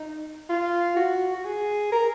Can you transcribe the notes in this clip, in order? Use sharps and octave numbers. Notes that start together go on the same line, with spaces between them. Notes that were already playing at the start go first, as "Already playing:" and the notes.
Already playing: D#4
F4
F#4
F#4
G#4
A#4